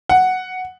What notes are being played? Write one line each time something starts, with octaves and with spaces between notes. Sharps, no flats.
F#5